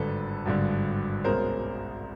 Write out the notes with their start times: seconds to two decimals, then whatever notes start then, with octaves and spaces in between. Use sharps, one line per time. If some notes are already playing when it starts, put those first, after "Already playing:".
Already playing: G#1 G2 D3 A4 B4
0.46 G#1 G2 D3
1.24 C2 B2 G#3 C#4 A#4 C5